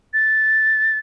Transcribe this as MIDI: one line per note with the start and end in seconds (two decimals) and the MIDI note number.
0.14 0.98 93